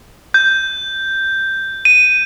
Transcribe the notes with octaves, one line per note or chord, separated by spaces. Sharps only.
G6
D#7